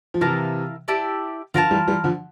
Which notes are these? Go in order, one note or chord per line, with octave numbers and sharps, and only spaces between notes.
F3
C3 E3 E4 A#4 F5 A5
E4 G4 D5 A5
D3 F3 F4 A#4 F5 A5
E3 G3
E3 G3
D3 F3